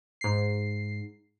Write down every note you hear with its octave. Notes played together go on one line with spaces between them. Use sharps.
G#2 C7